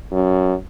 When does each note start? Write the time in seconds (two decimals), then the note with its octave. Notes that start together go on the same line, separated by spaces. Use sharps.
0.12 F#2